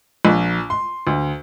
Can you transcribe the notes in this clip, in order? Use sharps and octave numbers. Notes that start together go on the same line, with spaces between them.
A#1
C6
D2